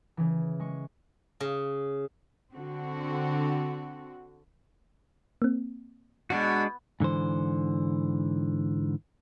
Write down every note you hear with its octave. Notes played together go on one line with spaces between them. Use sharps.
C#3 E3
G#3 C#6
C#3
D3 C4 F#4
A#3 C4
B2 G#3 D4 F#4
G#2 D3 E3 C5